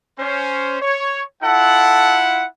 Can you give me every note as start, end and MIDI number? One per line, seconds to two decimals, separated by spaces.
0.19 0.79 61
0.19 0.79 72
0.82 1.23 73
1.43 2.45 64
1.43 2.45 65
1.43 2.24 69
1.43 2.45 78